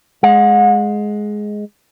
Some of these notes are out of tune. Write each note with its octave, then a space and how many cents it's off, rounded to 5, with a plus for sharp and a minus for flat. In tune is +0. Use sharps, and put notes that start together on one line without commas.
G#3 +10 F#5 -35